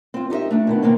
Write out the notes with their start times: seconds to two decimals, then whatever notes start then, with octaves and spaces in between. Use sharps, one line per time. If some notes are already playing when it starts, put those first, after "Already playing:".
0.14 C4 F4
0.30 D#4 G4 A4 D#5 E5
0.51 A3 D4
0.67 B2 D#3 B3
0.83 D#3 A#3 C4 C#4